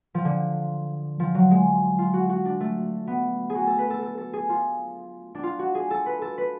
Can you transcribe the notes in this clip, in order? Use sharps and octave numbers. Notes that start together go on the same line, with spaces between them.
F3
D3
F3
F#3
G#3
F4
F#4
F#4
D4
A3
B3
G#4
F#4
A4
B4
A4
A4
A4
G#4
F4
D4
F4
F#4
G#4
A4
B4
A4
B4